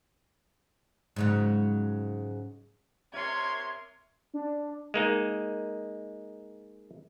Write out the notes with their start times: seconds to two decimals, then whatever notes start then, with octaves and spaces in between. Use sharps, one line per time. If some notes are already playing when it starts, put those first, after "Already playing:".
1.16 G#2 C#3 F#3
3.14 C3 A#4 C#5 E5 C6 G#6
4.34 D4
4.94 G#3 A#3 D#4